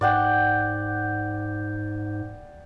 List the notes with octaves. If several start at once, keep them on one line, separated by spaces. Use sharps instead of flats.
G#2 D5 F#5 G5